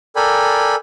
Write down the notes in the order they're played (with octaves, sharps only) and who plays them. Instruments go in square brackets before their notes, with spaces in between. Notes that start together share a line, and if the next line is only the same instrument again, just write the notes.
[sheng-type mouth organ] A4 A#4 D5 G5 G#5 B5